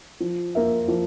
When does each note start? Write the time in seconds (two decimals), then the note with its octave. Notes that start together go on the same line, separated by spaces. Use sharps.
0.20 F3
0.55 A#3 F4 A#4 E5
0.88 F3